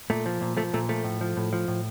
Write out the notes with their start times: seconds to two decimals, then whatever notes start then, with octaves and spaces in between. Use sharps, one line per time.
0.10 A#2 A3
0.26 F3
0.41 A#2
0.57 F3 A3
0.74 A#2 A3
0.89 F3 A3
1.04 A2
1.21 F3
1.37 A2
1.53 F3
1.68 A2